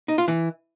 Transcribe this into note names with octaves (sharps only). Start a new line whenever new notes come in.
D#4
F4
E3